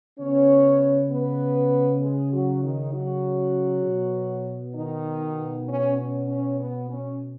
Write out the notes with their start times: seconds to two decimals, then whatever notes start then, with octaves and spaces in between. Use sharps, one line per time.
0.19 C#3 B3 C#4 C#5
1.10 B3 B4
2.01 G#3 G#4
2.32 F#3 F#4
2.63 D#3 D#4
2.93 F#3 F#4
3.84 B2 B3
4.75 D#3 D#4
5.67 C#4
5.97 C#4
6.27 C#4
6.59 B3
6.89 C#4